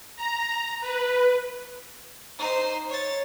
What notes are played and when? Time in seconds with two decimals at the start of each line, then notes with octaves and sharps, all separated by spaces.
0.16 A#5
0.81 B4
2.39 D#4 C5
2.89 C#5 A6